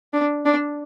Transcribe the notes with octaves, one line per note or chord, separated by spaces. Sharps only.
D4
D4